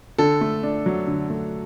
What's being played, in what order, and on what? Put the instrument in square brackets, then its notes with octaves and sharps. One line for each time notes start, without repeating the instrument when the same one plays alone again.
[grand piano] D3 A4
A3
D4
F#3
D3
A3